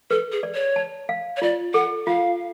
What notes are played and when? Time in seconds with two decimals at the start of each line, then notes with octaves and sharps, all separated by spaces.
0.11 A4 B4
0.32 G#4
0.43 D5
0.54 C#5
0.76 A5
1.09 F5
1.37 C#5
1.42 F4 D5
1.74 A4 F#5
2.07 F4 F5